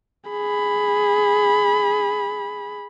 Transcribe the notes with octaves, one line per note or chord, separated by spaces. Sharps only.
G#4 B5